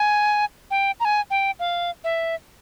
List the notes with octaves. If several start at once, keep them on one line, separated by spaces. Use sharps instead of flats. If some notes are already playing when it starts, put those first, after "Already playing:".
Already playing: G#5
G5
A#5
G#5
G5
F5
E5